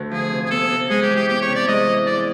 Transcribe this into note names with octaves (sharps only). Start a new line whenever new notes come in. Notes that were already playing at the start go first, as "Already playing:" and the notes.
Already playing: D2
F3 G#4
C3
G#4
B3 A4
C3
G#3 G#4
G4
E3
G4
B3 G4
C#5
C3
D5
G#3 D#5
E3
E2 D5